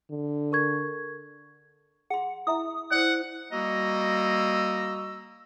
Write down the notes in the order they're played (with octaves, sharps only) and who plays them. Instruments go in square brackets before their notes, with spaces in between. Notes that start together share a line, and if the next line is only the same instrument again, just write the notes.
[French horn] D3
[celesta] A#4 C#6 G#6
[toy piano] G#4 C6 [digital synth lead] F#5
[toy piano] E4 E5 A#5 [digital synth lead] D#6
[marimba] E4 C5 [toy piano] D5 [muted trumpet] F#5
[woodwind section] G3 A#3 F#4 D#5 A#5 E6